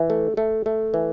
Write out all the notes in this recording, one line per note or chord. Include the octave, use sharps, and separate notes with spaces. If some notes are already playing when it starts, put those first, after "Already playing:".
Already playing: E3
A3
A3
A3
E3